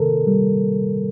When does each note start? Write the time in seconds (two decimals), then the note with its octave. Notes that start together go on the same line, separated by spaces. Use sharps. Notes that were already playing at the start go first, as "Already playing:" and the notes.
Already playing: C3 D#3 A#3 A4 A#4
0.27 G3